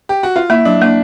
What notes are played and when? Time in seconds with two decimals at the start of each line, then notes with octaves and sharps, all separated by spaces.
0.09 G4
0.23 F#4
0.36 F4
0.50 A#3 E4
0.65 F#3 D4
0.81 A#3 D4